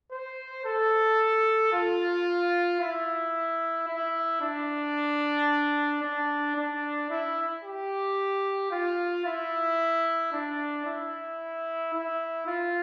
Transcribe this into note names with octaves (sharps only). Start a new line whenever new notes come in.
C5
A4
F4
E4
E4
D4
D4
D4
E4
G4
F4
E4
D4
E4
E4
F4